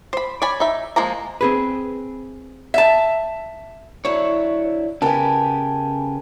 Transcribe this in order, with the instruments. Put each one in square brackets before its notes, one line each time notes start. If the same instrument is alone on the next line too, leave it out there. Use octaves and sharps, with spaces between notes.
[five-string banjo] C5 B5
C#5 D5 G#5 B5
D#4 E5
F3 G#3 A#3 A#5
[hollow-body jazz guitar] C4 G#4 B4
[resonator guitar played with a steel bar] E5 A5
[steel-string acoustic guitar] D3 F#3 E4 [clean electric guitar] C#5
[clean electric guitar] C#3 [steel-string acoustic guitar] B3 G4 A#4 [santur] G#5 A5